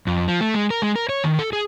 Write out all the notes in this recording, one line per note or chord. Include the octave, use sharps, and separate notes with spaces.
F2
F3
A3
G#3
A#4
G#3
A#4
C#5
D#3
A4
G#4